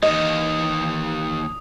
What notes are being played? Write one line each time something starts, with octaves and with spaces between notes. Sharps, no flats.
D#2 D#3 E3 D#5 D#6